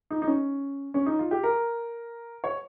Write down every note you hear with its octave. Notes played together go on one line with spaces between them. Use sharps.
D#4
D#4
C#4
C#4
D#4
F4
G4
A#4
C#5